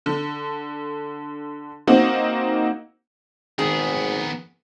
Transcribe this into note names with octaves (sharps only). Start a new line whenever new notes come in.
D3
A#3 C4 D#4 F#4
G#1 D#3 B3 G#4